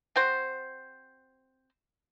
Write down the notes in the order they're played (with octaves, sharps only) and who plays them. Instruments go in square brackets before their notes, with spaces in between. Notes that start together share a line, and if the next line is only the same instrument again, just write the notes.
[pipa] C4 F#4 C5